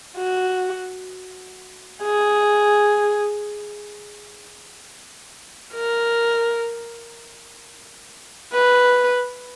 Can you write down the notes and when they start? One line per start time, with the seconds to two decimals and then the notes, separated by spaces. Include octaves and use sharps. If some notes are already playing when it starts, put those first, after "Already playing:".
0.17 F#4
2.03 G#4
5.74 A#4
8.53 B4